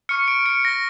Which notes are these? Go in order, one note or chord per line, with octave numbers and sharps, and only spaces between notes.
C#6 F6 C#7
D7
C#7
A#6